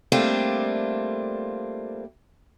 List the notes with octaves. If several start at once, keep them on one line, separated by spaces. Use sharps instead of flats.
G3 A3 A#3 C4 D4 F4